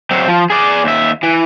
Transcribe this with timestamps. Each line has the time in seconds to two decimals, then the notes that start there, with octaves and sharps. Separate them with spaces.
0.11 F#3 C4
0.28 F3
0.50 G#4 D5
0.84 D#2 E5
1.23 E3